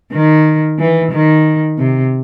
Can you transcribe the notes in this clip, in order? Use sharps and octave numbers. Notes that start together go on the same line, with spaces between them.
D#3
E3
D#3
C3